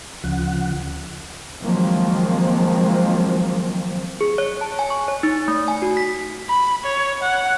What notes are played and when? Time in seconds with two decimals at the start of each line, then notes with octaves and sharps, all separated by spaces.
0.24 D2 C#3 F3 F#5
1.61 D#3 F3 F#3 G#3 A#3 C4
4.21 G#4
4.38 C#5
4.61 A5
4.79 G#5
4.90 C#6
5.08 C#5
5.23 D#4
5.48 A3
5.68 G#5
5.82 F#4
5.97 B6
6.49 B5
6.84 C#5
7.22 F#5